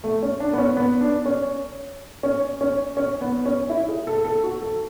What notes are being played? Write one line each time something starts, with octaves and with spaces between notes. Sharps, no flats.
A3
C#4
D4
B3
C#4
B3
D4
C#4
C#4
C#4
C#4
B3
C#4
E4
G#4
A4
A4
F#4
A4